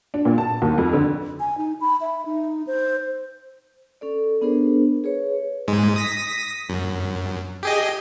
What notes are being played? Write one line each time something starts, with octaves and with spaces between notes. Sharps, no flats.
D4
A#2
A5
D#2
F2
D3
G#5
D#4
B5
E5
D#4
C5
C#4 A4 D5
B3 D4 G#4 A#4 C5
G#4 B4 C#5
G#2 G#3
D#6 A#6 B6
F#2
G4 G#4 D#5